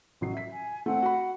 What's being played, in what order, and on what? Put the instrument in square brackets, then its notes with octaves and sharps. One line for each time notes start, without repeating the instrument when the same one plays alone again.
[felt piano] A1 F#3 C7
E5 B6
[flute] G#5
[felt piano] A3 C4 [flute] F#5
[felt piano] F#4 B5